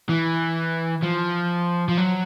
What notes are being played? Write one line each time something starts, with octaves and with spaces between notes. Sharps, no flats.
E3
F3
F3
F#3